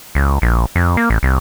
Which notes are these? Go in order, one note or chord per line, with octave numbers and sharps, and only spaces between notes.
C#2
A#1
F2
A#3
A1
C2